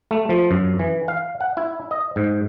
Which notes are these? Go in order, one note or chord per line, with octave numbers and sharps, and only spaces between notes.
A3
F3
F#2
E3
F5
F#5
E4
D#5
G#2